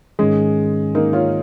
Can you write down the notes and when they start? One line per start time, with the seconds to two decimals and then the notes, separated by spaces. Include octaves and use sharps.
0.19 G#2 D#3 G#3 C#4 G#4
0.95 A#3 D#4
1.13 C#4 F4